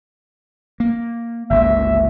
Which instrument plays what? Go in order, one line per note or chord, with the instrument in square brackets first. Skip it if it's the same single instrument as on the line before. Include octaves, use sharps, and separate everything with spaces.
[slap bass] A#3
[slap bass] G1 C#2 A#3 [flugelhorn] E5